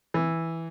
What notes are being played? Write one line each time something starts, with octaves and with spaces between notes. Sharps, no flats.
E3